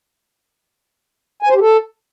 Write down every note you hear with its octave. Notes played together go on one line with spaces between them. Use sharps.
G#5
C5
G4
A4